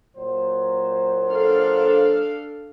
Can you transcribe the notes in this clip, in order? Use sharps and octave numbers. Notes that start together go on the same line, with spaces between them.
A#2 F#3 C5
D4 A4 F5